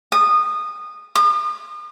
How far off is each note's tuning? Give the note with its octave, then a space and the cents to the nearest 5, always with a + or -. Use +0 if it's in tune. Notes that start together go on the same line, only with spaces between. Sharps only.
D#6 -20
D#6 -45